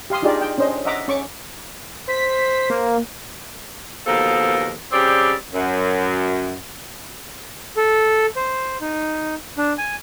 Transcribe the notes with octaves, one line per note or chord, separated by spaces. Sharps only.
G4 F5 C6 D#6
D4 D#4 F4 G4 G#4 D5
G5
C#4 D4 C5 D#5
D#5 E5 F#5 A#5 D6
C#4 C#6 D6
C5 B6
A#3
D#2 B2 F3 A4 A#4
C#3 G3 C4 D5
F#2
A4
C5
D#4
D4
G#5